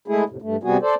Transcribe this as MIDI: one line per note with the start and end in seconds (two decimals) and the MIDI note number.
0.08 0.24 56
0.08 0.24 57
0.08 0.24 64
0.08 0.24 68
0.30 0.37 41
0.30 0.37 45
0.30 0.37 48
0.42 0.56 43
0.42 0.56 57
0.63 0.77 48
0.63 0.77 55
0.63 0.77 59
0.63 0.77 66
0.63 0.77 68
0.82 0.95 69
0.82 0.95 72
0.82 0.95 74